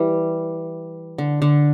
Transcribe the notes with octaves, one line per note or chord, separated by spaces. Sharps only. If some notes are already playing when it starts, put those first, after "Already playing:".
Already playing: E3 G3
D3
D3